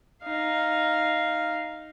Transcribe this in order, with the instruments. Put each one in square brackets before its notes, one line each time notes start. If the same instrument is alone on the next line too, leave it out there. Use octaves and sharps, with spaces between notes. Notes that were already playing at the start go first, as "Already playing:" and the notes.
[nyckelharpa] D#4 F5